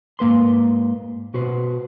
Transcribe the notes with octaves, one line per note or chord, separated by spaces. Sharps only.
G#2 A#3 B4 C6
B2 F#4 B4 C5